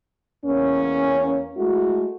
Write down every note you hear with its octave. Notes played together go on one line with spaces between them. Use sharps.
E2 A#3 C#4
G#3 A3 E4 F#4